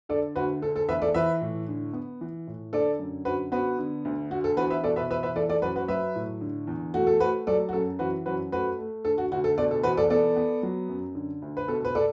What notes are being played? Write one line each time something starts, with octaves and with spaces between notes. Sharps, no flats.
D3 A4 D5
D2 F#4 B4
D3 A4
A4
E2 B4 E5
A4 D5
E3 B4 E5
A2
D3
B3
E3
A2
D3 A4 D5
F#2
D3 F#4 B4
B3 F#4 B4
D3
D2
D3 F#4
A4
E2 F#4 B4
B4 E5
B2 A4 D5
B4 E5
E2 B4 E5
B4 E5
E3 A4 D5
A4 D5
F#2 F#4 B4
F#4 B4
F#3 B4 E5
A2
D3
E2
A3 F#4
A4
A3 F#4 B4
F#3 A4 D5
F#4
F#2 A4
E3 F#4 B4
F#2 F#4 B4
A3 F#4 B4
A3
D3 A4
F#4
D2 F#4
A4
B2 A4 D5
A4
E2 F#4 B4
A4 D5
B3 A4 D5
B3
F#3
F#2
D3
D2
B4
B2 A4
B4
A4 D5